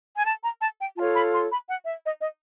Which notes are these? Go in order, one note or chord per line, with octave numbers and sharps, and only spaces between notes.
G#5
A5
A#5
A5
G5
F4 A4 C#5 A5
B5
C6
B5
F#5
E5
D#5
D#5